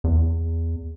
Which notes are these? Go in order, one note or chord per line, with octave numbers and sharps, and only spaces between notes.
E2